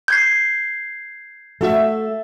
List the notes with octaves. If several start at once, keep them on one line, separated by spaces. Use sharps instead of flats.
G6 G#6 C7
A3 F#4 A4 E5